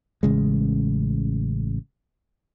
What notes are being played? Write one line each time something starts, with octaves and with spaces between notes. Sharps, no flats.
A1 C#3 G#3